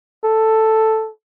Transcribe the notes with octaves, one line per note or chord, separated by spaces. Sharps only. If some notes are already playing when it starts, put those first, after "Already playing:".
A4